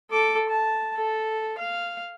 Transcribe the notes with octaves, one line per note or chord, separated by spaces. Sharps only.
A4 D6
A5
A4
F5